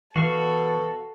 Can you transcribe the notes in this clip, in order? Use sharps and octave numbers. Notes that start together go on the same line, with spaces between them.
B2 E3 F#4 A4 F5 C#6